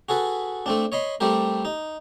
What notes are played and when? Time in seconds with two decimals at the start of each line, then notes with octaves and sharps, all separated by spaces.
0.09 F#4 G#4 A4 B4
0.66 A3 C4 D4
0.92 C#5 D#5 B5 C6
1.20 G3 A3 C4 G4 A#4
1.65 D#4